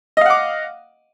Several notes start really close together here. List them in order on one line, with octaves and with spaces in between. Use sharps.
D#5 F5 F#5 D6